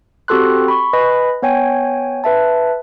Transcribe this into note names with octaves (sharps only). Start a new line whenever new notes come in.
C4 F#4 G4 A4 C6 F#6
B5 C#6
B4 D#5 G#5 B5
B3 C#5 G5 G#5
B4 E5 A5